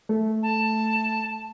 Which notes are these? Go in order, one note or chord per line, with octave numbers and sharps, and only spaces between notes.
A3
A5